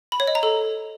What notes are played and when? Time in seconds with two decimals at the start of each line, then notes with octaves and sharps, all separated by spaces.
0.12 B5
0.20 C#5
0.27 D#5
0.35 A#5
0.43 A4